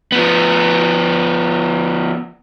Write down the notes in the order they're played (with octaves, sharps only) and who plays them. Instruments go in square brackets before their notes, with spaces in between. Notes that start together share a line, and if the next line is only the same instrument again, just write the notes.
[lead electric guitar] F3 B3